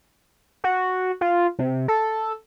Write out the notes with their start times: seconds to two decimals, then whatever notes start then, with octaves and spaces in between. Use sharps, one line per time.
0.64 F#4
1.21 F4
1.59 C3
1.88 A4